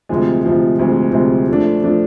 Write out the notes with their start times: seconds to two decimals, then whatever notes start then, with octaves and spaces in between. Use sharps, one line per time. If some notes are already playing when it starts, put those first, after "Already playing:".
0.09 D2 C3 F3 G#3
0.44 D2 C3 F3 G#3
0.79 D2 C3 F3 G#3
1.13 D2 C3 F3 G#3
1.48 F3 A3 D4
1.83 F3 A3 D4